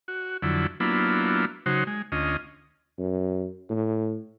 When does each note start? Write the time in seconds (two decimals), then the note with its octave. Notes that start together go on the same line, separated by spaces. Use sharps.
0.08 F#4
0.42 F2 D3 F#3 E4
0.80 F#3 A#3 B3 D4 E4 F4
1.66 C#3 F#3 D#4 F#4 C5
1.87 G#3
2.12 D2 C#4 F4 D#5
2.99 F#2
3.69 A2